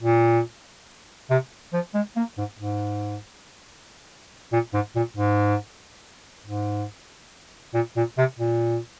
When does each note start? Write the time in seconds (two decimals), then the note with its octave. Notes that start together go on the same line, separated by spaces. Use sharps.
0.01 A#2
1.30 C3
1.73 F3
1.94 G#3
2.16 A#3
2.38 G#2
2.59 G#2
4.53 A#2
4.74 G#2
4.96 A#2
5.17 G#2
6.46 G#2
7.74 A#2
7.96 A#2
8.18 C3
8.39 A#2